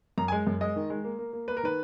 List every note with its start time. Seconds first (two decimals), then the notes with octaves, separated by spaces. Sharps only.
0.18 F#2 A#5
0.28 G#5
0.32 G#3
0.47 F#2
0.61 G#3 D#5
0.76 D#3
0.90 G#3
1.04 A#3
1.19 A#3
1.33 A#3
1.48 A#3 B4
1.57 A#4
1.63 D#3 B4